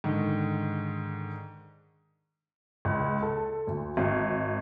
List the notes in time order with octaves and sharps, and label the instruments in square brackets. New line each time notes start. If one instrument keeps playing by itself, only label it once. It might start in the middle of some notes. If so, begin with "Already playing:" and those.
[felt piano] G#2 D3 D#3
[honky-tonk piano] C#2
A4
D2
G#1